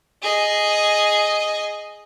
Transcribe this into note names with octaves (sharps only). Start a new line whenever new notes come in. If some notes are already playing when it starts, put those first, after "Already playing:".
G#4 D#5